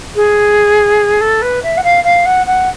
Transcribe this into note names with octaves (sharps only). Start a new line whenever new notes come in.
G#4
A4
B4
E5
F#5
F5
F5
F#5
F#5